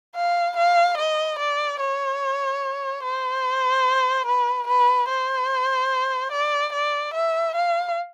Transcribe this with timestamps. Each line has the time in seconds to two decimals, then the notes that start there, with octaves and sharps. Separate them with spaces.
0.16 F5
0.57 F5
0.98 D#5
1.39 D5
1.80 C#5
3.03 C5
4.26 B4
4.68 B4
5.09 C5
6.32 D5
6.73 D5
7.14 E5
7.56 F5